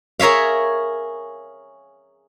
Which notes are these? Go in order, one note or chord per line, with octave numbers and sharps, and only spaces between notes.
G#4 A#4 C#5 E5 F5